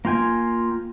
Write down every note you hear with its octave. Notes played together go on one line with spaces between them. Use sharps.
A#3 F4 G5 G#5